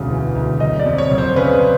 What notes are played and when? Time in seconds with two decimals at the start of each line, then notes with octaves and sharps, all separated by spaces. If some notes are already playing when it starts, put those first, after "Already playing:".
Already playing: E1 D2 C#3
0.10 E3
0.35 D2
0.60 F#1 D#5
0.79 D5
0.86 F2
0.98 C#5
1.11 F#1
1.18 C5
1.36 C#3 B4